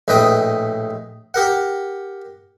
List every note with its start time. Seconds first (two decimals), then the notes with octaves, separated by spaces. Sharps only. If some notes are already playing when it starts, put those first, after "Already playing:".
0.08 A#1 A2 B4 D#5 G5 D#6
1.34 G4 A#4 F#5